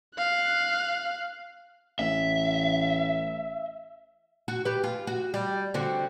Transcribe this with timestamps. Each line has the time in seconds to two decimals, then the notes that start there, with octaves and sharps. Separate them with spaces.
0.17 F5 F#6
1.99 A1 E5
4.48 F#4
4.65 G4 B4
4.84 F4
5.07 F#4
5.34 G3
5.74 D3 C4 F#4